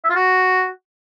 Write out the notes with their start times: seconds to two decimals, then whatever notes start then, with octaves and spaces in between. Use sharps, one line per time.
0.04 E5
0.10 F4
0.15 F#4